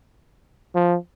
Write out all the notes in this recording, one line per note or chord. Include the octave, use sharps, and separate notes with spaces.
F3